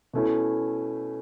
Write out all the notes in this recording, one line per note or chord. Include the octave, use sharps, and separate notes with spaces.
B2 A3 C#4 E4